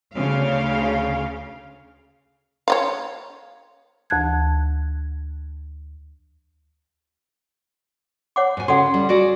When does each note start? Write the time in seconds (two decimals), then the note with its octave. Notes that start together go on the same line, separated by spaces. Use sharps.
0.15 D2 C#3 F5
2.68 C#5 D#5 F5
4.10 D2 E3 A5 F#6 G#6
8.36 C#5 F#5 D6
8.57 G#2 G#5
8.68 C#3 F#4 A4 F#5
8.94 G3
9.09 F#4 G#4 D5